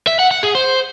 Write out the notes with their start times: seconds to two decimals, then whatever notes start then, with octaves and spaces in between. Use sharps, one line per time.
0.07 E5
0.19 F#5
0.31 F#5
0.43 G#4
0.55 C5